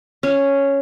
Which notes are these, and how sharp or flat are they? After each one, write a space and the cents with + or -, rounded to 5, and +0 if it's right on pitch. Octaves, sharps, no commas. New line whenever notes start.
C#4 +0 F5 -35